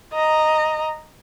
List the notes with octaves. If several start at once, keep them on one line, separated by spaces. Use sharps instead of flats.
D#5 A#5